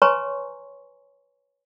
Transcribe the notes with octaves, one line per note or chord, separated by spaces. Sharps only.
B4 C#5 G#5 A#5 C6 C#6